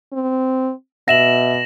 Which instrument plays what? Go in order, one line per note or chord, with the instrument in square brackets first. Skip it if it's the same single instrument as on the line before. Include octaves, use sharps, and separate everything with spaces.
[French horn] C4
[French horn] B2 [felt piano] E5 [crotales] A#6 E7 F#7